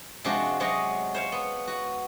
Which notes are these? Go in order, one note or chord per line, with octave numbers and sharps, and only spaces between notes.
C3 F3 G#3 D4 F#4
C3 F#3 G#3 F#4 C#5 D#5
C5 C#5 F5
B3
F#4